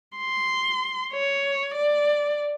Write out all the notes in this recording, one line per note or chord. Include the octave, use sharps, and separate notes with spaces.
C6
C#5
D5